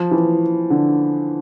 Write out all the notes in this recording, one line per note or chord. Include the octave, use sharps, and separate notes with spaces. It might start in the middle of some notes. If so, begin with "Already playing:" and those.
Already playing: F3
E3
D3